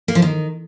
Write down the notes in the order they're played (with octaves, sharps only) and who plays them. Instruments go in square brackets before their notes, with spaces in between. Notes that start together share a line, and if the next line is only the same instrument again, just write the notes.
[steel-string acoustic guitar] A#3
F3
D#3